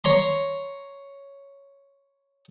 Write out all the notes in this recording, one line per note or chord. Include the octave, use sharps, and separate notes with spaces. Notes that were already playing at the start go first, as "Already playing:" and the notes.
C#5 A#5 C6